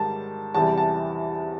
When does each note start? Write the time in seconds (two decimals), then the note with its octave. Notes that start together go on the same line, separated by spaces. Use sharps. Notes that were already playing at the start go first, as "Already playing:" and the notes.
Already playing: G#2 D#3 G3 A5
0.54 E2 C3 E3 G3 A5
0.78 A5